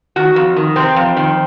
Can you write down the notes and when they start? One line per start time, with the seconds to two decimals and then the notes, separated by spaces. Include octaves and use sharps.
0.16 D#3 F#4
0.36 F2
0.56 D#3
0.76 C3 C4
0.96 F2
1.17 D#3